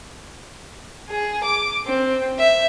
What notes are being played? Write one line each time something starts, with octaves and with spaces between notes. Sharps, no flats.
G#4
D6
C4
E5